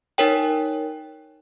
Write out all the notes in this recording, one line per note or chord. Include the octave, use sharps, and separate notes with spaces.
D#4 A#4 C#5 G5